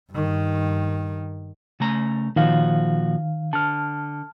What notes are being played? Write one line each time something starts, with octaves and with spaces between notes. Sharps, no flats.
G2 D#3
C#3 A3 A#5
A#2 D#3 F3 F#4 F5
D3 A5 F6